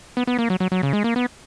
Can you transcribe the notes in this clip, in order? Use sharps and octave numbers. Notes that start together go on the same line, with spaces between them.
B3
B3
A#3
F#3
F#3
F#3
C#3
G#3
A#3
B3